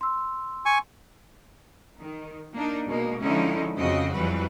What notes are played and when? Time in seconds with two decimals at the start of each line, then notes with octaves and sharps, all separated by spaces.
0.01 C6 E6
0.66 G#5 C#6
1.99 D#3
2.55 A#3 D4 D#4
2.87 B2 G#3 A#3
3.23 D3 F3 G#3 C#4 D#4 E4
3.77 F2 C#3 F3 C4 F#4 D#5
4.14 F2 E3 F#3 G3 B4